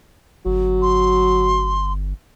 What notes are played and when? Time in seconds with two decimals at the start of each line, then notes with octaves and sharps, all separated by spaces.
0.45 G1 F#3
0.82 C6